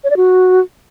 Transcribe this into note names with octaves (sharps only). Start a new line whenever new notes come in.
C#5
D5
F#4